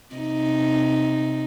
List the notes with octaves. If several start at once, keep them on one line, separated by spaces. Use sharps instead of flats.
C3 D#4